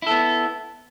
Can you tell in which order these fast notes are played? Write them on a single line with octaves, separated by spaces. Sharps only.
E4 A4 B3